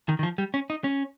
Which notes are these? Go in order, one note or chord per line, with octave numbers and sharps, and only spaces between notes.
D#3
D#3
F3
G3
C#4
D#4
C#4